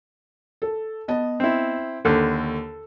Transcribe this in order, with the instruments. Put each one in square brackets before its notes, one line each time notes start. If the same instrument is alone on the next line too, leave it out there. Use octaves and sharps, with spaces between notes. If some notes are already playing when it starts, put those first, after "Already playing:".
[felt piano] A4
B3 D#5 A5
[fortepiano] C4 E4
[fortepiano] D#2 D3 [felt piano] A4